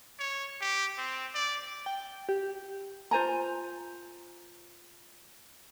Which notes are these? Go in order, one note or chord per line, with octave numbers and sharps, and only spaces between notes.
C#5
G4
C4
D5
G5
G4
F4 C5 G#5 A#5